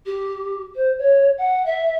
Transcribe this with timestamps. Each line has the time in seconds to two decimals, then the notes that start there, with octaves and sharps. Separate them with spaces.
0.06 G4
0.75 C5
0.98 C#5
1.37 F#5
1.65 E5